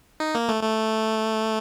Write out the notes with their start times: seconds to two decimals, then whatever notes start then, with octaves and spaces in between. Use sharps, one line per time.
0.20 D#4
0.35 A#3
0.49 A3
0.63 A3